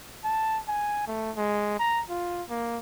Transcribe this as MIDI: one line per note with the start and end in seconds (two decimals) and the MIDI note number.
0.24 0.59 81
0.68 1.07 80
1.07 1.31 57
1.37 1.75 56
1.80 2.02 82
2.10 2.43 65
2.49 2.78 58